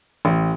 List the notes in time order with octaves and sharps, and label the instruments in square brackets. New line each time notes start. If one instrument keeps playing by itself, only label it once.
[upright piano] A1